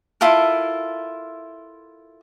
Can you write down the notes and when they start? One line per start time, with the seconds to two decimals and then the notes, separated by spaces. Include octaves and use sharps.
0.21 E4 F4 A4 A#4